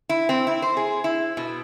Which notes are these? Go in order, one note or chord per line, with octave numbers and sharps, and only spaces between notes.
E4
C4
E4
C5
G#4
E4
B2